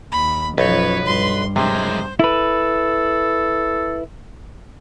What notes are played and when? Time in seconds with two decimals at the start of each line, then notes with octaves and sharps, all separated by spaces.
0.12 D#2 B5
0.58 B1 F#2 F3 B4 C#5
1.06 G2 C6
1.56 F#2 C3 G#3 C5
2.19 E4 A4 B4